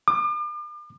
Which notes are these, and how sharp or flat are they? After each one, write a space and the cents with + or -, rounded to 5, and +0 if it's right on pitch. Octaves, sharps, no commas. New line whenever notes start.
D6 +40